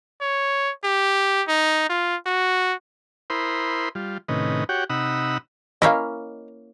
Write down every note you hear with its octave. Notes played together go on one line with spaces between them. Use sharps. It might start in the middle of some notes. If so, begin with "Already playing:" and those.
C#5
G4
D#4
F4
F#4
E4 A#4 C5 B5 C6 D#6
G3 F4
A2 C3 D#3 C#4 B4 D#5
F#4 G4 C#5 F#5 G5
C3 D#4 F#5 B5 D#6 E6
A#3 C#4 E4 D#5 F5